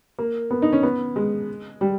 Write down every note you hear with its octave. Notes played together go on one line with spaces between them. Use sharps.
A#3
B3
D#4
C#4
B3
G#3
G3